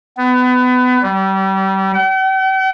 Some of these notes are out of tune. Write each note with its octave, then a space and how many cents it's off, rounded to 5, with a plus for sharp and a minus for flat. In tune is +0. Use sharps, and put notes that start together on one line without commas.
B3 +25
G3 -30
G5 -45